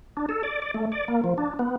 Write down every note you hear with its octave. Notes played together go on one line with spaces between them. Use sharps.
D4
A4
D5
D5
A3
D5
A#3
F3
D4
B3